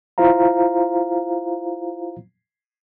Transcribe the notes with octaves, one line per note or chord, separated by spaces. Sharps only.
E4 F4 C5 F5 A#5